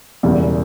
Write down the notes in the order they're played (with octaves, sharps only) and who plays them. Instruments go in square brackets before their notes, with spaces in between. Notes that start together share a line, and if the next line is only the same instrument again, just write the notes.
[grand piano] E1 E2 C#3 E3 G3